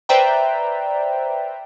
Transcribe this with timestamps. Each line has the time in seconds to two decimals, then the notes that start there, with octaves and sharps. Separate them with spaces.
0.09 B4 C5 D5 E5 G5 A#5